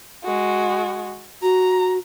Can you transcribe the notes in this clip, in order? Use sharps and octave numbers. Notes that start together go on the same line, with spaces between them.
G#3 F#4
F#4 A#5